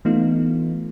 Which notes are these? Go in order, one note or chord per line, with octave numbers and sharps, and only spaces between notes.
E3 A3 B3 D#4 F4